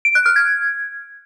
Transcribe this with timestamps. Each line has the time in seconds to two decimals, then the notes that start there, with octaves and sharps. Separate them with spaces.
0.05 D7
0.15 F#6
0.26 F6
0.36 G#6